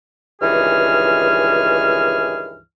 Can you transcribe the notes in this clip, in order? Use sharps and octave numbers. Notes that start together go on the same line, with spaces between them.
C#2 G2 D#3 E3 G#4 F6